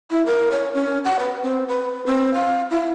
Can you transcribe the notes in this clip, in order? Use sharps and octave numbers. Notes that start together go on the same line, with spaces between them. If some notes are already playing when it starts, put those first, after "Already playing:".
E4
A#4
C#5
C#4
F#5
B4
C4
B4
C4
F5
E4